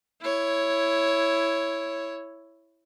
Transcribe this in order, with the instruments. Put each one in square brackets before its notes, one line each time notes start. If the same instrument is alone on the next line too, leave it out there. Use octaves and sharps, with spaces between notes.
[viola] E4 C#5